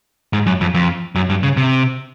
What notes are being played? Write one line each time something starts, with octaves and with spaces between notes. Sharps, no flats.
G#2
F#2
F2
F2
F#2
G2
C#3
C3